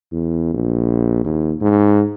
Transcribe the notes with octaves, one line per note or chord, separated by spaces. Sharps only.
E2
A#1
D#2
G#2